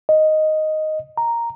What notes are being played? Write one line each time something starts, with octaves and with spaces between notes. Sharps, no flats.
D#5
A#5